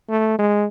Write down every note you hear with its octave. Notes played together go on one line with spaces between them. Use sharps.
A3
G#3